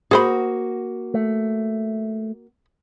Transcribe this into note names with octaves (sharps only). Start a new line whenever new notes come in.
A#3 F#4 G#4 C5 B5
A3